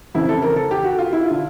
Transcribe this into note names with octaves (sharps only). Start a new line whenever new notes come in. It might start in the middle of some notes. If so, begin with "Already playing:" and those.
F2 C#3 E3 E4
A4
A#4
A4
G4
F#4
F4
E4
D3 F4